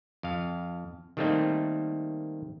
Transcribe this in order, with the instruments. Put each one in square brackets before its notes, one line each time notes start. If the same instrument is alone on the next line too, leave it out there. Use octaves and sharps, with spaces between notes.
[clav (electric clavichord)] F2 F5
D#3 G3 A3 A#3 C4 D#4